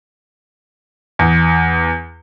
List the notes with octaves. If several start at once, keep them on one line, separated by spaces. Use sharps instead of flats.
E2